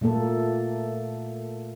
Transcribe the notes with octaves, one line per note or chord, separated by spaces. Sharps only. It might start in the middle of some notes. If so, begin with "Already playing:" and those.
A#2 A3 A#3 A4